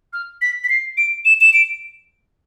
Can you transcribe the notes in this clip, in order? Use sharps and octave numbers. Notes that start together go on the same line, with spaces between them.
F6
B6
B6
C7
D7
E7
E7
D7